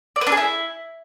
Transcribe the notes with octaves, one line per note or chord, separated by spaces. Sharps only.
D5
B4
D4
G#4
E4